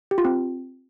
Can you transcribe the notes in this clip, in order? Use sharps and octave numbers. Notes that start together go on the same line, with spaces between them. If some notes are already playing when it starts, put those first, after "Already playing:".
G4
F4
C4